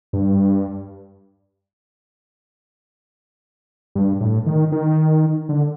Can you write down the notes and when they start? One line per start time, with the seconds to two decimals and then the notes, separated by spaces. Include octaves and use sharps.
0.13 G2
3.95 G2
4.21 A2
4.47 D#3
4.72 D#3
5.49 D3